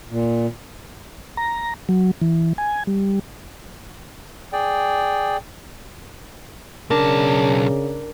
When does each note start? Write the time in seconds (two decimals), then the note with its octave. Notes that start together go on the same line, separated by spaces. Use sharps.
0.10 A#2
1.37 A#5
1.89 F#3
2.22 E3
2.58 G#5
2.87 G3
4.53 G#4 D5 G5
6.90 B1 C#3 D4 A#4 A5